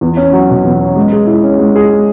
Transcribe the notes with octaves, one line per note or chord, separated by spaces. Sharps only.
E2
C#4
F#3
B2
E2
C#4
G#3
G#4
E4
C#4
G#3
G#4